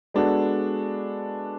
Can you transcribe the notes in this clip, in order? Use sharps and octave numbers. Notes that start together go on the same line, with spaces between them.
G#3 B3 D4 F#4 A4